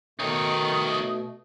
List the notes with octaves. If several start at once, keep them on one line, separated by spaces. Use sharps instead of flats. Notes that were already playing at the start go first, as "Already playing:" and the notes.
B2 D#3 A3 D#4 C#5 D#6